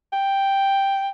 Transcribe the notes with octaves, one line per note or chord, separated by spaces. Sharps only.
G5